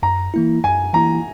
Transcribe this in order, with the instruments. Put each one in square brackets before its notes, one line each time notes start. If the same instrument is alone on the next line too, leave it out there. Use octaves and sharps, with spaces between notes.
[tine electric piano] F#2 [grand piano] A#5
[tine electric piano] E3 A#3 E4
[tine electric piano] F#2 [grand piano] G#5
[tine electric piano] E3 A#3 E4 [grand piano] A#5